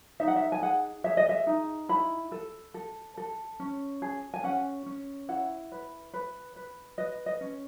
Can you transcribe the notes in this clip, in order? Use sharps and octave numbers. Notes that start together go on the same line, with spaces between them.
D#4 E5
F#5
E5
G#5
G#4 F#5
G#4 E5
D#5
E5
D#4
E4 B5
A4
A4
A4
C#4
G#4
G#5
C#4 F#5
C#4
E4 F#5
B4
B4
B4
B4 D#5
D#5
C#4